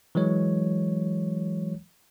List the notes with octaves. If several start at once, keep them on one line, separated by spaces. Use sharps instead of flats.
E3 F#3 G#3 C#5